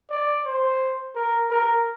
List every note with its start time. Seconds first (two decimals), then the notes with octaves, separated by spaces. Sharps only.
0.10 D5
0.45 C5
1.15 A#4
1.51 A#4